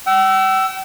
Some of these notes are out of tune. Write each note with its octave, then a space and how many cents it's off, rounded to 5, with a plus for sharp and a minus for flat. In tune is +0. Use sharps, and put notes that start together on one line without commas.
G5 -45 E6 +5